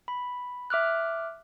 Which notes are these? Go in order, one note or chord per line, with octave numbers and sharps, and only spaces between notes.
B5
E5 D6 F6 F#6